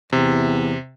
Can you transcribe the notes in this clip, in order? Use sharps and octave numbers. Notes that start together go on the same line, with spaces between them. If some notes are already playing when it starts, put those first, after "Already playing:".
E2 C3